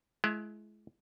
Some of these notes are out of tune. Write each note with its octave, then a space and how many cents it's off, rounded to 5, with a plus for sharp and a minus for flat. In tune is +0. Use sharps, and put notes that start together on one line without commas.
G#3 +35 E4 +30